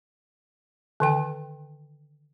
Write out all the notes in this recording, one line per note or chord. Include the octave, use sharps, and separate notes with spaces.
D3 D#3 G5